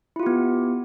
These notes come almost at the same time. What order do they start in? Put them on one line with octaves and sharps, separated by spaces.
E4 F4 G4 B3